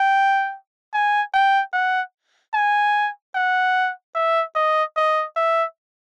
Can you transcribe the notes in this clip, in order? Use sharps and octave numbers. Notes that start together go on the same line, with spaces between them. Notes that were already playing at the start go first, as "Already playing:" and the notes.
Already playing: G5
G#5
G5
F#5
G#5
F#5
E5
D#5
D#5
E5